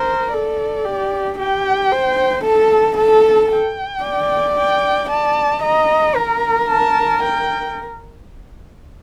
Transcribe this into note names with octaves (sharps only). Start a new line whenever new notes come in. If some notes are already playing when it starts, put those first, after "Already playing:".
Already playing: A#4 C5
A4 D5
G4
G4 G5
C5
A4 A5
A4 A5
G5
D5
G5
D5 A5
D#5 A#5
A#4 A#5
A5
G5